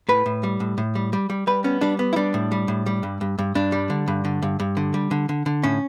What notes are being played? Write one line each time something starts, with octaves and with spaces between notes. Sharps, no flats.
A2 B4
A2
G3
A2
A2
G3
G3
G3
G3 B4
B3 C#4
G3 D4
B3
E4
G3 D4
A2
G3
A2
G3
G2
G2
G2
G2 D4
G3
D3
G2
D3
G2
G2
D3
G3
D3
D3
D3
A2 C#4